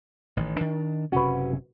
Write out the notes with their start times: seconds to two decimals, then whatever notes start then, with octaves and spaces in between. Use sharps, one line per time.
0.37 A1 D#3
0.56 D#3 D4
1.12 F#1 C3 C#4 F#4 B4